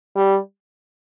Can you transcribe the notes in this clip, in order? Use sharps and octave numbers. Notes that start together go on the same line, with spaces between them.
G3